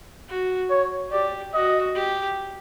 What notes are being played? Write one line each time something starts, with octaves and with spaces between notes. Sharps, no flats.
F#4
C#5
G4 D5
F#4 D#5
G4